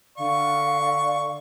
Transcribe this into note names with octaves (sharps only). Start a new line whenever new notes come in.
D3 D5 F5 C#6